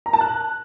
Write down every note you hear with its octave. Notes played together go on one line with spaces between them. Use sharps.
A#5
A5
F#6